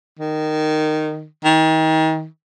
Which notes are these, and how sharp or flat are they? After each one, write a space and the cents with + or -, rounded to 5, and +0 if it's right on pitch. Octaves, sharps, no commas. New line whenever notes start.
D#3 -10
D#3 +35